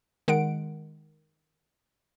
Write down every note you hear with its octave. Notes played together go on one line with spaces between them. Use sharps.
D#3 G#3 F#5 D7